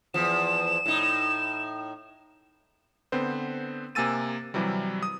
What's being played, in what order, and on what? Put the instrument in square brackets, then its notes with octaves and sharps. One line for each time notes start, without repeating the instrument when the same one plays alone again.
[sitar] E2 F3 [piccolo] E7
[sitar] A2 D#4
[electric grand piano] D3 B3 C4 B4 C5
C3 A#3 G#5 E6 A6 D#7
C3 E3 F#3 G3
D#6